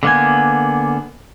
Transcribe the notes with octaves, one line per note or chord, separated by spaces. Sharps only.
D3 A#3 B3 G#5